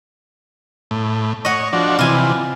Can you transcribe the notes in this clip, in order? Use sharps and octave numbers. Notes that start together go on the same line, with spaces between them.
A2
C#5 D#5 F#5
F3 D4 F#4
C3 E3 F4 G#5